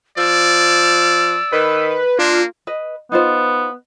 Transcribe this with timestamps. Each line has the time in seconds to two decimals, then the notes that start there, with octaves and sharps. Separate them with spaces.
0.17 F3 D5 E6
1.52 D#3 B4
2.19 A#3 D4 F4
2.67 B4 D#5
3.12 B3 D#4 F4 C5